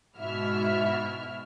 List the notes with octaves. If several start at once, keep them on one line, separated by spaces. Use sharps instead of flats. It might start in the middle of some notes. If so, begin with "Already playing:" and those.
G#2 B2 E4 F#4 E5 F6